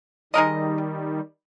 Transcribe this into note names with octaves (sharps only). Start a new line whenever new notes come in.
D#3 G3 G#3 D#4 A#4 D#5